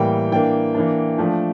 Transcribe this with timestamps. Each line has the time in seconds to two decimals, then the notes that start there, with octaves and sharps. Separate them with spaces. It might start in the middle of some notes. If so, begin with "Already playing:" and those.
Already playing: A2 E3 G3 A#3 G5
0.31 E3 A#3 D4 G5
0.75 E3 A#3 D4
1.18 F3 A3 D4